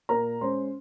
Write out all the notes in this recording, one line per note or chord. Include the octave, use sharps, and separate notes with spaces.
A#2 A#4 A#5
G#3 C#4 C5 C6